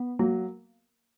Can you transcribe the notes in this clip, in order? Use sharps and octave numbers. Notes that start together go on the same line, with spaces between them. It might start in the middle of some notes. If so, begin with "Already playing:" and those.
Already playing: B3
F#3 A#3